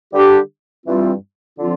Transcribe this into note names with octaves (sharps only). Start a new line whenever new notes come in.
D3 G3 D4 G4
G2 E3 G3 C4 F4
D3 F3 C4 F4